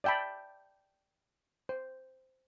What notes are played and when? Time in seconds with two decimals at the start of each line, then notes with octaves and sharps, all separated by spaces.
0.04 D5 E5 G5 A5 B5
1.69 C5